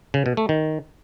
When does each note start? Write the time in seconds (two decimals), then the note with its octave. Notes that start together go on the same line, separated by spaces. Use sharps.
0.14 C#3
0.26 B2
0.37 A3
0.49 D#3